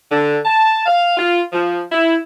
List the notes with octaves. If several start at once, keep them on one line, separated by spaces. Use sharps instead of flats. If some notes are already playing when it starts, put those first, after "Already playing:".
D3
A5
F5
F4
F3
E4